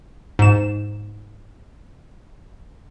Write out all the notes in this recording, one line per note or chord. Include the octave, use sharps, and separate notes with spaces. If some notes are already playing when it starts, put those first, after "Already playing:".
G#2 E7